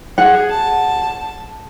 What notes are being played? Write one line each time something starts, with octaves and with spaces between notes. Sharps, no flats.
G#4 F#5
A5